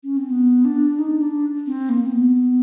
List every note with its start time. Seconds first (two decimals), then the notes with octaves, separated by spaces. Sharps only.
0.03 C#4
0.17 C4
0.30 B3
0.65 D4
0.99 D#4
1.21 D4
1.66 C4
1.89 A#3
2.06 C4
2.12 B3